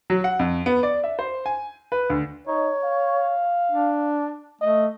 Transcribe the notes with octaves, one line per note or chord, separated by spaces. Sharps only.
F#3
F#5
F2
B3
D5
E5
C5
G#5
B4
D2
D#4 C#5
F5
D4
A3 D#5